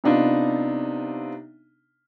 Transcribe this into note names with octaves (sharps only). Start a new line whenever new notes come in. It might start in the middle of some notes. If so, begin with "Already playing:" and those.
C3 B3 D4 D#4 F4